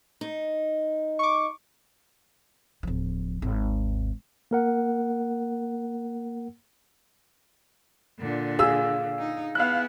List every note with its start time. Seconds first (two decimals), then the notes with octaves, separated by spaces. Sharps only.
0.21 D#4
1.19 C#6 D6
2.83 D1 F3
3.42 G#1 D#2
4.51 A#3 A#4 F#5
8.19 A#2 D3
8.59 G#4 F5 E6
9.19 D#4
9.55 B3 E4 F5 F#6